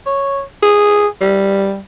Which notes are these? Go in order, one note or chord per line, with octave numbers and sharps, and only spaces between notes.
C#5
G#4
G3